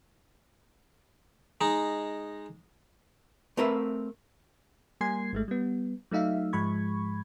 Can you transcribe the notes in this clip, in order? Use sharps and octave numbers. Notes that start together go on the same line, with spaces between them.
G#3 D#4
A3 C4 A#4 B4 E5
G3 A#3 G#5 C6 G#6 C7
G#1 G#3 A3
G3 B3
F#3 A3 D#4 E5 F5
G#2 F3 G#3 B5 C#6 G#6